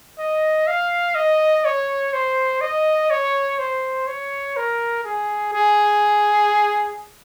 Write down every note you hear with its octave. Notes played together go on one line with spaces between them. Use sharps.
D#5
F5
D#5
C#5
C5
D#5
C#5
C5
C#5
A#4
G#4
G#4